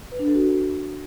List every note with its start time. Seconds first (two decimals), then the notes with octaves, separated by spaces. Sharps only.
0.11 B4
0.19 D4
0.27 A4
0.35 F#4